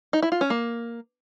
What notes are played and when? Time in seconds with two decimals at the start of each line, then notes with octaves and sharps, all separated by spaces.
0.13 D#4
0.22 E4
0.32 F4
0.41 C#4
0.50 A#3